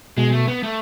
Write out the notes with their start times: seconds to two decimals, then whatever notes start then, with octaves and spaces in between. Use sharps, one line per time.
0.17 B2 G#3
0.32 A3
0.48 B3
0.63 A3